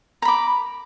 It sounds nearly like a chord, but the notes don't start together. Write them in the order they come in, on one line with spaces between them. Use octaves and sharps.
A#5 B5 D6